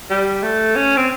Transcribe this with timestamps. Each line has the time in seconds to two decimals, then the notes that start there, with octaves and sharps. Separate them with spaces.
0.10 G3
0.43 A3
0.76 C#4
0.97 C4